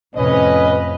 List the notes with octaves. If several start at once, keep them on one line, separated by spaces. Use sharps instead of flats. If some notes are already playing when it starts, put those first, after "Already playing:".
F2 A2 C3 C#4 B4 D#5